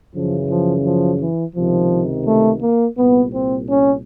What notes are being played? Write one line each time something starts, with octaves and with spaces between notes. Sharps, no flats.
F#2 C#3 E3 F3
F3
F3
E3
C#2 C3 D#3 F3
A3
A#3
C2 A#2 B3
C4
C#4